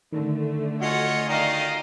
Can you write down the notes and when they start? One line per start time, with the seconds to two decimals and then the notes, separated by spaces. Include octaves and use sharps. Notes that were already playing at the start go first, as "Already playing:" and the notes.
0.12 D3 D#3 A3
0.81 F4 F#4 C#5 D#5 F#5 G#5
1.28 D#3 D5 D#5 F5